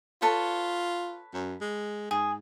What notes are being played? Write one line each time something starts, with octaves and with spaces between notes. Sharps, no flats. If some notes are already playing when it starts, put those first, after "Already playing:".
F4 A4 B4 C#5
F#2
G#3
G#2 G#4